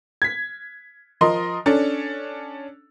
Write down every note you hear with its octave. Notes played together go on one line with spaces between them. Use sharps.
G#6 B6
F3 A#4 D#5 C6
C#4 D4 A4